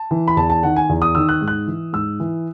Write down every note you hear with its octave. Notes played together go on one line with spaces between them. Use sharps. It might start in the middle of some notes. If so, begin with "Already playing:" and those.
Already playing: A5
E3
B5
E2 A5
A5
D#3 F#5
G#5
E2
D#6
D#3 E6
F#6
G#2
F#6
E3
G#2 E6
E3